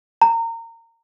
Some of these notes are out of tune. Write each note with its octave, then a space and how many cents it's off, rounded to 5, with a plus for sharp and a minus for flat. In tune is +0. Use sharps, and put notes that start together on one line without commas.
A#5 -25